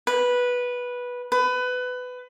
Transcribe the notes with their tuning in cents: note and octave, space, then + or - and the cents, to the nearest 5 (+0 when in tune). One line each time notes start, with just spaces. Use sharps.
B4 -10
B4 +20